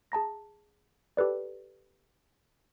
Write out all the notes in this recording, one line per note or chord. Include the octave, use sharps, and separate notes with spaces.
G#4 A5 A#5 A#6
G4 A4 B4 D5